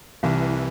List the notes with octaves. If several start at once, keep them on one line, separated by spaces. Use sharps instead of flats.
C2 E3